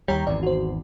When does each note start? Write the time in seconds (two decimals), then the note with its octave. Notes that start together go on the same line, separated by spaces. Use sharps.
0.08 D#2 G3 C#5 G5 A#5
0.27 G#1 E2 D5
0.43 F#4 C5